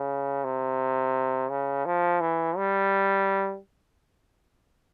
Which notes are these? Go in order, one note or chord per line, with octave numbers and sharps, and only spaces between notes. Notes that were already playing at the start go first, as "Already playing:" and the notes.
Already playing: C#3
C3
C#3
F3
E3
G3